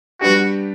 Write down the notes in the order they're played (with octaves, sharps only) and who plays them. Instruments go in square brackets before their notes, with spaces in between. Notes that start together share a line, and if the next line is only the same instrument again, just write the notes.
[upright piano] G3 B3 D4 G4 [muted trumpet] F#4